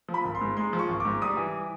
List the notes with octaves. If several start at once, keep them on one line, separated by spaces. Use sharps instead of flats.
F3
B5
G#1
C6
G#2
G#3 C6
F3
C#6
G#1
G#2 D6
G3 D#6
E3